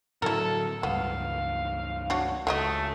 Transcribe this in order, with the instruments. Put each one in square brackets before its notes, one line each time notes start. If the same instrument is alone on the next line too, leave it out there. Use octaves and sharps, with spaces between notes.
[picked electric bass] A2 D3 F#3 [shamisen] E4 A#4 [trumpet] A4
[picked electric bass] C#2 G2 [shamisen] B3 [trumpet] F5
[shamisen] D4 F#4 C#5
[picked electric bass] C#2 C#3 [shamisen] F#3 F4 D#5 [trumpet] A3